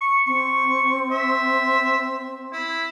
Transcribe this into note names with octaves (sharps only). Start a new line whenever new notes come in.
C#6
C4 C#6
E5
E4